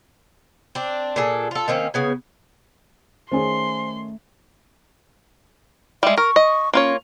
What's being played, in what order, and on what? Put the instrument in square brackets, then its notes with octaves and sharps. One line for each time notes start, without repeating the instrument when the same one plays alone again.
[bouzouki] C4 D4
A#2 D4 G#4 A4
F4 A4
D#3 A#3 C4 C#4
C#3 B3 G#5
[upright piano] D#3 C#4 G#4 [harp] A3 [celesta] C5 D5 G#5 [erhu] C6
[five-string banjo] G3 G#3 [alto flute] E5
[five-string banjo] A#4 [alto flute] C#6
[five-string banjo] D#5
[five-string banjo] A#3 F4 C#5 [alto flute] C#4